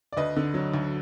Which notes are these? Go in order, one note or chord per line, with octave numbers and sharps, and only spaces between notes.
D5
D2 B4 D#5
D3
F#3
D2